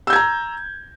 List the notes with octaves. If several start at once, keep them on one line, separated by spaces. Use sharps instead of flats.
A#5 E6 G6 G#6